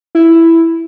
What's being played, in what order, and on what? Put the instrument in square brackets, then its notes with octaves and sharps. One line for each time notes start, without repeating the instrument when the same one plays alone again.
[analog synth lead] E4